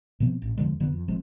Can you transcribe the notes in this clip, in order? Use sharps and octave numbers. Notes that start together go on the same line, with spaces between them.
B2 F3 B3 C4
A1
E2 D3 F3 G#3
F1 D3 F#3 B3
F2
G1 F3 G#3 C4